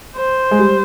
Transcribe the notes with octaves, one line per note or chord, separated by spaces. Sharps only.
C5
G#3
G3